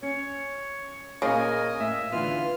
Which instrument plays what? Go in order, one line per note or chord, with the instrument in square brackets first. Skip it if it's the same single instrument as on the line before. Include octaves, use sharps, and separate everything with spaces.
[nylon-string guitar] C#4 [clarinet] C#5
[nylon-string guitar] A#2 C#4 G#4 [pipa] C#3 [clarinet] A#4 [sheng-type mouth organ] D#5 G#5
[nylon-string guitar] A2 [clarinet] E5
[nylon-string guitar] D3 E3 B3 [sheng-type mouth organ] F4 F6 [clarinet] B4